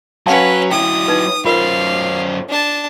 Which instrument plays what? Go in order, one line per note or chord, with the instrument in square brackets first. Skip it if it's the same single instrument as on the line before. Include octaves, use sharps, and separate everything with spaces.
[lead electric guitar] F#3 [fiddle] C#4 B4 [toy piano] F5 F#5 A5
[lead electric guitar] F#3 E4 [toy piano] G5 [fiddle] D#6
[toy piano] D#4 B4
[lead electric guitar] F#2 C5 [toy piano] F4 A#4 [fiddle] F5
[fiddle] D4 A5